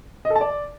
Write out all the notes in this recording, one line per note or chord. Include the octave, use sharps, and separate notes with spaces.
D#5
A4
A5
D5